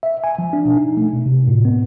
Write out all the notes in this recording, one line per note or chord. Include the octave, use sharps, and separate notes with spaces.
E5
G#5
F3
D4
B2
D#4
A3
B2
C3
A2
B3